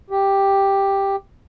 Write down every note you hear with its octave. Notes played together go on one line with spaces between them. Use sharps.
G4